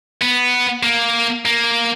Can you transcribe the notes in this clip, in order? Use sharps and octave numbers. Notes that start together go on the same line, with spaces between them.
B3
A#3
A#3